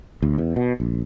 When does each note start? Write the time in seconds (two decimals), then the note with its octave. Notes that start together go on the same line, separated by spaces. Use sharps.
0.22 D2
0.38 E2
0.56 B2
0.80 A#1